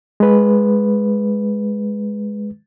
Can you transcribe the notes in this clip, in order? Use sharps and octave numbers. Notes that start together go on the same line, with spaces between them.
G#3 B4